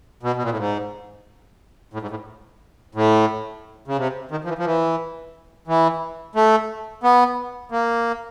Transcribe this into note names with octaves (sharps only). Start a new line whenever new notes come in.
B2
B2
A#2
A2
G#2
A2
G#2
A2
A2
C#3
C3
D#3
F3
E3
F3
E3
E3
A3
B3
A#3